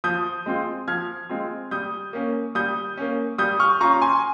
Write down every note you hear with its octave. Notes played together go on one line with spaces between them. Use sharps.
F3 D#6 G6
G#3 C4 F4
F3 F6 G#6
G#3 C4 F4
G3 D#6 G6
A#3 C#4
G3 D#6 G6
A#3 C#4
G3 D#6 G6
C#6 F6
C#4 F4 A#5 C#6
G#5 C6